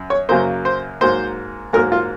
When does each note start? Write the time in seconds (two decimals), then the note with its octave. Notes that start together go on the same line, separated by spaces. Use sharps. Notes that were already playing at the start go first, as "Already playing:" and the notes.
Already playing: F#2
0.10 C#5
0.29 F#2 C#3 F#3 A#3 C5
0.65 C5
1.01 G#2 F#3 A#3 C5
1.73 G#2 F#3 A#3 A#4
1.92 F4